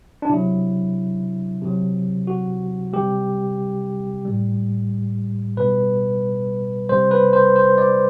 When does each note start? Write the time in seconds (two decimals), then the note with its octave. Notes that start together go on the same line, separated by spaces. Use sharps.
0.22 D4
0.29 C3 F#3 E4
1.62 C3 F#3
2.27 F#4
2.93 C3 G3 G4
4.25 A2 G3
5.57 B2 G3 B4
6.89 C3 G3 C5
7.11 B4
7.33 C5
7.56 C5
7.78 D5